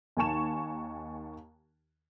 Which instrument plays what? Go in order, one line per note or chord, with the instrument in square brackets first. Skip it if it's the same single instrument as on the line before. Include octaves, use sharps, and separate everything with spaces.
[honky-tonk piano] D#2 D#3 G#5 A5 C#6 E7